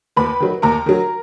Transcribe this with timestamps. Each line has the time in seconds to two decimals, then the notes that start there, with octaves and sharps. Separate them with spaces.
0.16 D#2 B4 B5
0.40 D#3 F#3
0.62 D#2 A#4 A#5
0.86 D#3 F#3